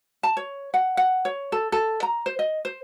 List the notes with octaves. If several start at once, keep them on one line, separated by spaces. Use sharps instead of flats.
A5
C#5
F#5
F#5
C#5
A4
A4
A#5
C5
D#5
C5